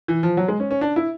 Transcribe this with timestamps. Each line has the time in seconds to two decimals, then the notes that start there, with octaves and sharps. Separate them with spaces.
0.08 E3
0.23 F3
0.37 F#3
0.48 G#3
0.60 C#4
0.71 C#4
0.81 D4
0.96 E4